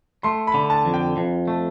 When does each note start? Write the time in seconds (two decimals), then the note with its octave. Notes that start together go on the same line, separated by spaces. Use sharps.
0.23 A3 C6
0.47 B5
0.54 D3
0.70 A5
0.85 F2
0.94 G5
1.17 F2
1.48 A3